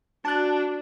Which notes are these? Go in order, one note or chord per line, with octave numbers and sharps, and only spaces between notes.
D4 F#4 A5 F#6